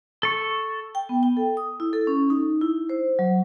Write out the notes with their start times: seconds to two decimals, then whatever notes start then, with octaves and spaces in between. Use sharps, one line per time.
0.23 A4 C#6
0.95 G5
1.09 B3
1.23 G5
1.37 A4
1.57 D#6
1.80 E4
1.93 A4
2.07 C#4
2.30 D#4
2.61 E4
2.89 C5
3.19 F#3